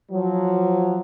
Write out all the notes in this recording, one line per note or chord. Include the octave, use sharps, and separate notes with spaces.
F3 F#3